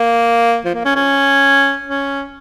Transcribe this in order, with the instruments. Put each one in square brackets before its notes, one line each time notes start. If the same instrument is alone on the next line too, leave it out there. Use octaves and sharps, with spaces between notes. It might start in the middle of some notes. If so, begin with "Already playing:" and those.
Already playing: [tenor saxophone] A#3
F3
A#3
C#4
C#4
C#4